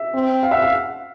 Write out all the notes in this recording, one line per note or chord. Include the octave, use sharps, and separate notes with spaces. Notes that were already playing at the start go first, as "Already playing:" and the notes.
Already playing: E5
C4
F5
E5 F#5
F5